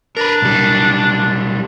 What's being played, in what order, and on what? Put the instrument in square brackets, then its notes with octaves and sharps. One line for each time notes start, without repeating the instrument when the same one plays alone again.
[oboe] D4 [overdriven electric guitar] A#4 B4
[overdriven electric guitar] B1 G3